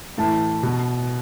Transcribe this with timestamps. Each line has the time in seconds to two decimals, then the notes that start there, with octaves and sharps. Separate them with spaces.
0.18 A2 E3 A5
0.63 B2